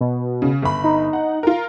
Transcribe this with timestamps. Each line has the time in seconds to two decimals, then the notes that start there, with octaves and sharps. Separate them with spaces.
0.01 B2
0.42 C#3
0.63 G1 B5
0.84 D#4
1.13 F#5
1.43 F4 A#4